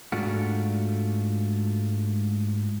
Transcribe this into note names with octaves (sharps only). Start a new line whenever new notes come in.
G#2 A3 D4 F4 F#4